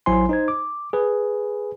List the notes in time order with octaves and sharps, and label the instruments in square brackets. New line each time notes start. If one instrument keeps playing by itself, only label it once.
[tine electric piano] A1 F#3 E4 C5 G#5 C6
D#4 C5 G#6
D6
G#4 B4